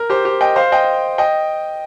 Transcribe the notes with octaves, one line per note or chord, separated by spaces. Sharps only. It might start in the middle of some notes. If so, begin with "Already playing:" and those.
Already playing: A#4
G4 C5
G4
D#5 G5
C5 F5
D#5 G5
D#5 G5